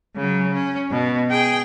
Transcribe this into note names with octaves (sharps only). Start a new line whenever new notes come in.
C#3 F#3
C#4
B2
G#4 G5